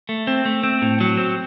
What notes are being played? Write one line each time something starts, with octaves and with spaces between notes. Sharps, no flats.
A3
C4
A3
C4
A2
F#3
C4